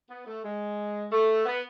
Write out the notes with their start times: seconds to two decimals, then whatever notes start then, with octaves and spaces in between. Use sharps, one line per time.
0.10 B3
0.27 A3
0.44 G#3
1.12 A3
1.46 B3